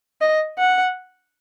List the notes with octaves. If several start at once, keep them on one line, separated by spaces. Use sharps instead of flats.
D#5
F#5